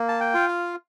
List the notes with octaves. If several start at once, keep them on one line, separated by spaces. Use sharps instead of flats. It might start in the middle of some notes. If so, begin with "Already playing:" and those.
Already playing: A#3
A5
G5
F4
F5